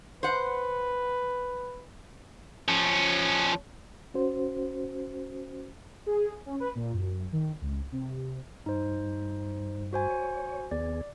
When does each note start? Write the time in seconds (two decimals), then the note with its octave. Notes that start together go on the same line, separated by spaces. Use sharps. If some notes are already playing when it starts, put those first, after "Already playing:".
0.23 B4 C5 F#5
2.68 F3 C#4
4.14 C#4 F#4 C5
6.06 G#4
6.46 C#4
6.60 B4
6.75 A#2
6.93 F#2
7.32 D#3
7.61 C#2
7.92 C3
8.66 G2 D#4 C5
9.93 F#4 C5 G#5
10.10 C#5
10.71 D#2 B3 G#4 D5